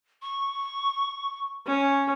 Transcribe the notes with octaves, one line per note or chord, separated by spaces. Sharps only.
C#6
C#4